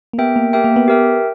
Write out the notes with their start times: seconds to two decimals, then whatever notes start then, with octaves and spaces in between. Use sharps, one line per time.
0.13 A#3
0.18 B3 G4 A#4 E5 G5
0.36 A#3
0.53 G4 A#4 E5 G5
0.64 A#3
0.76 B3
0.88 G4 A#4 E5 G5